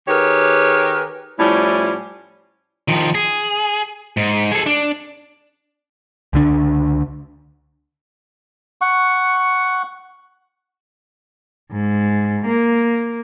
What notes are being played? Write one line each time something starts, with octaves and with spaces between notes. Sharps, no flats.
D#3 G4 G#4 A#4 B4 C#5
A2 F3 G3 C#4 E4
D#3 F3
G#4
G#2
G#4 A4
D4
C#2 D3 D4
F#5 C#6
G#2
A#3